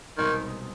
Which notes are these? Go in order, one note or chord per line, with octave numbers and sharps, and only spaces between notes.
C2 B2 D#3 G#3 C4 D#4